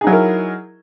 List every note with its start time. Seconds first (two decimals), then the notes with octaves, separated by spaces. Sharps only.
0.01 G#4
0.04 D#4
0.07 F#3
0.10 E4
0.13 A#4